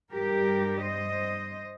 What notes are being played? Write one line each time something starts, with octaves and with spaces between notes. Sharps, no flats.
G2 G3 G4 A#4
C5 D#5